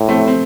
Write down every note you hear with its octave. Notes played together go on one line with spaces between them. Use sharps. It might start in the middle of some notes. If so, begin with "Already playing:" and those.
Already playing: A2
A3 C4
C4